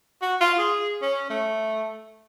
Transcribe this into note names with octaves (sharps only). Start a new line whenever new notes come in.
F#4
F4
G#4
C#4
A3